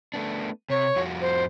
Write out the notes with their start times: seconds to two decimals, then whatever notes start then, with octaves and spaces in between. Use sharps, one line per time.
0.14 A3 B3 D4
0.70 C3 C#5
0.96 F2 F4 F#4
1.21 C5